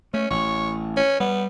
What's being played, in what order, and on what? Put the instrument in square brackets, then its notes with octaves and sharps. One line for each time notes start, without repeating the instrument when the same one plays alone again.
[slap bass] A3 [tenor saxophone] C#4
[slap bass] A1 [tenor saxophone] C#5
[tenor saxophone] C#4
[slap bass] G3 [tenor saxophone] B3